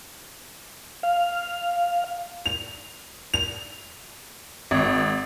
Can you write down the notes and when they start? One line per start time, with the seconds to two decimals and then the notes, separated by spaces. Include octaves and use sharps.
1.03 F5
2.46 F7
3.34 F7
4.71 G#1